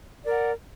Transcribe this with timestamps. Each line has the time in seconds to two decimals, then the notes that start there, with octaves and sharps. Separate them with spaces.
0.22 D5
0.26 A#4
0.30 F#5